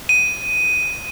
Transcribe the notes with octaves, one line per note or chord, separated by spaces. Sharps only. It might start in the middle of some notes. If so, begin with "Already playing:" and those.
D#7